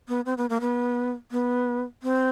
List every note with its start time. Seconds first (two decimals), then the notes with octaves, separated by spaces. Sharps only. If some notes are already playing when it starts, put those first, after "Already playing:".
0.08 B3
0.26 C4
0.38 B3
0.50 A#3
0.61 B3
1.31 B3
2.03 C4